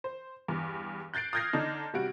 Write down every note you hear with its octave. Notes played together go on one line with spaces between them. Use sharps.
C5
E2 G2
F#6 G6 A6 C7 D7
D#6 F6 G6 G#6 A#6 C7
D3 D4 D#4
C3 G3 F#4 D7